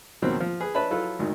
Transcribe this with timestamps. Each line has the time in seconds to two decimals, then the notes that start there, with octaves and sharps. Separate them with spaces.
0.22 D#2 B2 D#3 F#3 C4
0.40 F3
0.61 G#4 B4
0.75 D4 B4 C#5 E5 A5 B5
0.91 F#3 E4 F4 A4 B4
1.19 G#1 D2 D#3